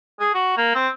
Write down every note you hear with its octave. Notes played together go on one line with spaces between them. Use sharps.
G#4
F#4
A#3
C4